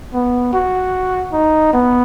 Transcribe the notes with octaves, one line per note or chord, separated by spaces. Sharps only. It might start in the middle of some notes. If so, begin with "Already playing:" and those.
B3
F#4
D#4
B3